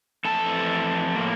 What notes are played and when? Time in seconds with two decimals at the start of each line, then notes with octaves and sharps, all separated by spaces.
0.25 F2 E3 A3 A4 A5
1.15 A2 F3 A#3